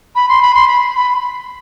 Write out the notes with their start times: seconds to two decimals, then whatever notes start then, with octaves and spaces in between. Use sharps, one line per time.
0.15 B5
0.29 C6
0.42 B5
0.55 C6
0.68 B5
0.95 B5